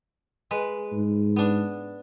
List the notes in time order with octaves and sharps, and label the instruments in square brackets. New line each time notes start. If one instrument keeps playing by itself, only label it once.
[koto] G#3 B4
[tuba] G#2
[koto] B3 D4